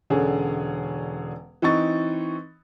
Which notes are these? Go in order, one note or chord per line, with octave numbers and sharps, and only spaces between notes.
E1 D3 C#4 G#4
E3 C4 D#4 C#6 A6